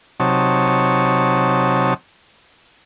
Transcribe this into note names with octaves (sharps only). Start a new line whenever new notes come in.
C3 F#3 D#4 C#5 A5